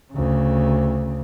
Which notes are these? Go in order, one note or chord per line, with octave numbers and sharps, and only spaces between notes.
D2 C#3